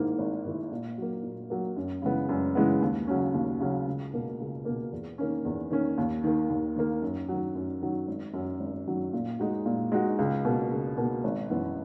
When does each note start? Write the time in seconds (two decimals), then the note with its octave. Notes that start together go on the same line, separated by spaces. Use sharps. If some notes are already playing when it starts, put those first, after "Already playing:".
Already playing: G#2 D#3 A#3 E4
0.18 G#1
0.45 G#2 D#3 A#3 E4
0.71 A#2
0.98 F#3 A#3
1.23 A#2
1.50 F#3 A#3
1.77 F#2
2.02 C#3 E3 G#3 B3
2.29 F#2
2.55 C#3 E3 G#3 B3
2.81 D#2
3.07 C#3 F#3 C#4
3.34 D#2
3.60 C#3 F#3 C#4
3.87 C#2
4.14 B2 A#3
4.40 C#2
4.65 B2 A#3
4.92 E2
5.18 D#3 A#3 C#4
5.45 E2
5.70 D#3 A#3 C#4
5.98 D#2
6.24 D#3 A#3
6.49 D#2
6.76 D#3 A#3
7.02 F#2
7.29 D#3 F#3
7.55 F#2
7.82 D#3 F#3
8.08 G#1
8.34 F#2 D#3 F#3
8.60 G#1
8.87 F#2 D#3 F#3
9.13 A#2
9.39 G#3 D#4 F#4
9.66 A#2
9.92 G#3 D#4 F#4
10.19 C#2
10.45 B2 A#3
10.71 C#2
10.97 B2 A#3
11.24 G#1
11.50 F#2 E3 B3